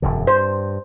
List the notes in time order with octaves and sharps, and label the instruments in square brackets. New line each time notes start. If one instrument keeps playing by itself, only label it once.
[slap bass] E1 F#2 D3
[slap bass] G2 [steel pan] C5